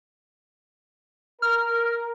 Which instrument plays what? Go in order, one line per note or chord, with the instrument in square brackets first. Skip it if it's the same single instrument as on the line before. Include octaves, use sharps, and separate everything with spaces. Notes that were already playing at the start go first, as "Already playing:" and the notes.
[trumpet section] A#4 [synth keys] F6